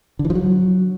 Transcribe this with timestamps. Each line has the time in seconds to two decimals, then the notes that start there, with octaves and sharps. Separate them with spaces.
0.19 D3
0.25 E3
0.30 F3
0.35 F#3